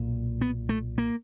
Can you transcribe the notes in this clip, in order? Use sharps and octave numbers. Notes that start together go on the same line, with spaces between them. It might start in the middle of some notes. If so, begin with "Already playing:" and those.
Already playing: B1 A#2
B3
A3
A#3